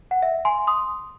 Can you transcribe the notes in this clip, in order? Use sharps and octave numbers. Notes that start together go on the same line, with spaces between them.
F#5
E5
G#5 C6
C6 D#6